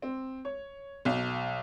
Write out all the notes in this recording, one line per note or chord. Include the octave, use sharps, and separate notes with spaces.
C4
C#5
B1